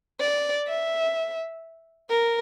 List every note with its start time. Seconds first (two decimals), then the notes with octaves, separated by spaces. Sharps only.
0.20 D5
0.68 E5
2.10 A#4